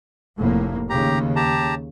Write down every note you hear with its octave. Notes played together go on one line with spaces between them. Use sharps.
F1 A2 A#3
D#2 C#3 G4 A#5
G4 A5 A#5